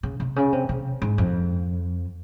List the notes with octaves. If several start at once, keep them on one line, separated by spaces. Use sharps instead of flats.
C#3
C3
C#3
C3
C3
G#2
F2